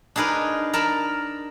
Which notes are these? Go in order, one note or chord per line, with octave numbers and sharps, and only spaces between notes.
D4 D#4 G#4 A#4 B4
A#4 A5 B5